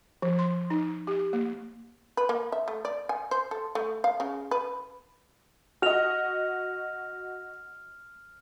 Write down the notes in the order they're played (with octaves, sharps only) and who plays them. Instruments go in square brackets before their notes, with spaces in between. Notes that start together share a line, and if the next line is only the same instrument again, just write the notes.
[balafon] F3
C6
D#4
G4
A#3
[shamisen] B4
A#3
E5
A3
D5
G#5
C5
A4
A3
F5
C#3
B4
[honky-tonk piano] F#4 D#5 [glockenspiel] F6 F7